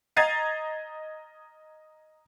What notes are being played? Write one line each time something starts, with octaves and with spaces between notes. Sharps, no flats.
D#5 A#5 G#6 A6 C7 D#7